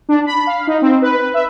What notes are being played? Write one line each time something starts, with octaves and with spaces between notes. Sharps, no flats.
D4
B5
F5
D#4
C4
B4
E5